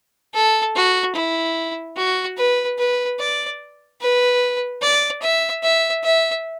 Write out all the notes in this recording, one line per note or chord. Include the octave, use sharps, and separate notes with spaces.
A4
F#4
E4
F#4
B4
B4
D5
B4
D5
E5
E5
E5